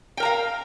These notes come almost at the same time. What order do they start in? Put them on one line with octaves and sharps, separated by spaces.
G5 A#4 A#5 F5